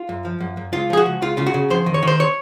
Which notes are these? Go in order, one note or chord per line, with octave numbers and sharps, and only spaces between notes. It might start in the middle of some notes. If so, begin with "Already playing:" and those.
Already playing: F4
F#2
F3
F#2
F#2
C#2 F4
F3 G#4
F#4
C#2
C#2 F4
C#3 F4
F#4
C#3
F2 C5
D#3
C#5
D#3 C5
C#5